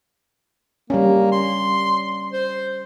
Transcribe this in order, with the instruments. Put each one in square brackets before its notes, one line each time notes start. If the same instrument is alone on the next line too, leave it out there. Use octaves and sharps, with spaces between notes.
[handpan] G3 C#4 [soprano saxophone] A#3
[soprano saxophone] C6
C5